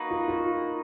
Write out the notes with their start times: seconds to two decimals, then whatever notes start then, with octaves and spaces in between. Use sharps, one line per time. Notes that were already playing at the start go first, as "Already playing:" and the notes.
Already playing: A#3 D#4 F#4 B4
0.11 F4
0.28 F4